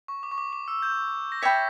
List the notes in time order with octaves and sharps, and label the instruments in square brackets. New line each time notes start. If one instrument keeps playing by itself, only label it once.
[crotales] C#6
D6
C#6
D6
D6
E6
G6
A#6
[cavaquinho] C#5 E5 G5 B5 [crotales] B6